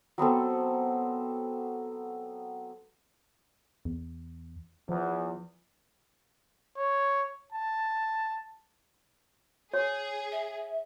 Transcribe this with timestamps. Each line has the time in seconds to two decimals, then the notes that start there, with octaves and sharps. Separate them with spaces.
0.18 F#3 B3 C4 A4
3.85 E2
4.89 E2 F3
6.77 C#5
7.52 A5
9.74 G#4 C#5
10.32 E5